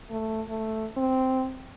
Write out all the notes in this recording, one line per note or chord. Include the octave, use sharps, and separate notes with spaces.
A3
A3
C4